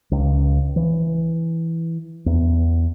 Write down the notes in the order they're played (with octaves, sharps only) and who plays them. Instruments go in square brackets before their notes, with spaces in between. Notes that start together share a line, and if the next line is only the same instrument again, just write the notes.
[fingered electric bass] C#2
E3
E2